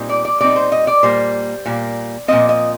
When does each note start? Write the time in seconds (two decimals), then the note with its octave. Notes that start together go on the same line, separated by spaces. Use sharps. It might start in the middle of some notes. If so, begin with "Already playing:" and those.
Already playing: A#2 G3 C4 D#4
0.09 D5
0.25 D5
0.41 A#2 G3 C4 D#4 D5
0.56 C5
0.72 D#5
0.87 D5
1.03 A#2 G3 A#3 C5
1.66 A#2 G3 A#3
2.28 A#2 F3 C4 D#5
2.49 D#5